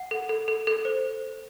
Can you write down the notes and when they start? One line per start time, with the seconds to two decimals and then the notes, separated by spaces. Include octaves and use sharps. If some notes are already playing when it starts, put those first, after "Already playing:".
Already playing: F#5
0.11 A4
0.29 A4
0.48 A4
0.67 A4
0.85 C5